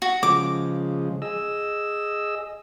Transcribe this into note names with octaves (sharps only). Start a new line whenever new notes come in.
F#4
C#3 F3 G#3 D6
G#4 D#5 E6